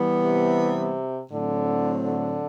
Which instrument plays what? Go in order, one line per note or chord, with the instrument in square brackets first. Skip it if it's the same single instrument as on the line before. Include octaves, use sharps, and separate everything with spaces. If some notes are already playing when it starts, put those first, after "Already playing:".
Already playing: [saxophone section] E3 G3 B3
[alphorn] C3
[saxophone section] A2 F#3 C4 [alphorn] D3
[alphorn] D3